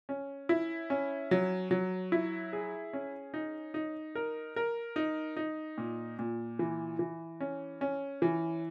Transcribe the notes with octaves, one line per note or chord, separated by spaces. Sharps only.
C#4
E4
C#4
F#3
F#3
E4
G#4
C#4
D#4
D#4
A#4
A#4
D#4
D#4
A#2
A#2
E3
E3
C#4
C#4
E3